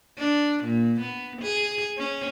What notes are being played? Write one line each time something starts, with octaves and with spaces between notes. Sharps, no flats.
D4
A#2
B3
G#4
C#4